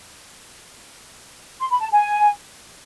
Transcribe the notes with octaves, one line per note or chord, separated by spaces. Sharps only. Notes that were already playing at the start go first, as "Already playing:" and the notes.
C6
B5
A5
G#5